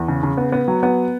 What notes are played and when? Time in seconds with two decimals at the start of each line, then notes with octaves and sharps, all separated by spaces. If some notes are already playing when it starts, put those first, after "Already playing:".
Already playing: E2
0.08 C#3
0.23 C#3
0.37 B3
0.52 B3
0.68 F#3
0.83 B3